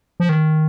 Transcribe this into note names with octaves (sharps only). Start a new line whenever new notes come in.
F3
D#3